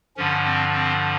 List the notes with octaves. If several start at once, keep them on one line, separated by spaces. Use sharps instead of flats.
G2 D3 F3 C#4
C4
C4